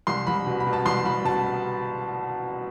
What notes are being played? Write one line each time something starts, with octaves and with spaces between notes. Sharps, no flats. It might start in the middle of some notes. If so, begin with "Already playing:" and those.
C2 C6
C2 B5
B2
B5
B2
A5
C2 C6
C2 B5
B2 A5